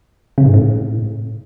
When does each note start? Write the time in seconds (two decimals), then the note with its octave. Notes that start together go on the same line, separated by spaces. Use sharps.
0.38 C#3
0.46 G#2
0.54 A2